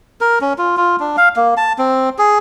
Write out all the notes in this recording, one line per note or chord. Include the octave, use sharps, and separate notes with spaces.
A#4
C#4
F4
F4
D4
F5
A#3
A5
C4
G#4